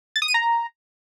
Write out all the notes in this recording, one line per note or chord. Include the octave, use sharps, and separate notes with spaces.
A6
D#6
D#7
A#5